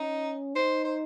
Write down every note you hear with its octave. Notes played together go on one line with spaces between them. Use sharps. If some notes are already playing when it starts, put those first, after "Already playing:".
Already playing: C#4 D#4
D#4 C5
C5